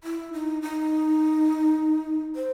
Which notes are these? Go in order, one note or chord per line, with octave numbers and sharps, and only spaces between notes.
E4
D#4
D#4
C5